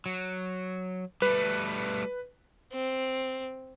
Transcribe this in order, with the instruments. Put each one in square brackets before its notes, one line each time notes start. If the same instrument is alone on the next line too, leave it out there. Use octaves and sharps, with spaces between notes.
[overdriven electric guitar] F#3
[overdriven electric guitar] G3 A3 [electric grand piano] B4
[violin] C4